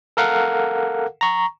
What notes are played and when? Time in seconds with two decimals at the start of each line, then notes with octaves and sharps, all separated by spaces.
0.17 A4 A#4 F5 F#5
1.21 A#5 C#6